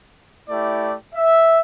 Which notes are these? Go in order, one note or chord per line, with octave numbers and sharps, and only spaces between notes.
A3 E4 G4 D5
E5